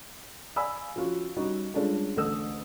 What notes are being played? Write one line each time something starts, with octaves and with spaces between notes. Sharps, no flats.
D5 F5 G#5 B5 E6
F3 C#4 F4 F#4
G3 C#4 D#4 F#4
G3 G#3 C#4 D4 F4 A4
A1 D2 A4 D#6 E6